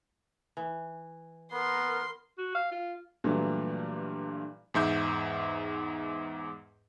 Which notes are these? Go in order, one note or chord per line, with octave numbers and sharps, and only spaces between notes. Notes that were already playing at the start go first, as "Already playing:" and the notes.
E3
B3 A#4 C6
F#4
F5
F4
G2 A#2 E3 F#3 A3
E2 G#2 E5 G6